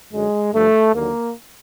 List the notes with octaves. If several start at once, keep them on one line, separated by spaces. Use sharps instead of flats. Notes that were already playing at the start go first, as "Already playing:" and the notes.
F#2 D3 F#3 G#3
G2 D3 F3 A3
D#2 D3 F#3 A#3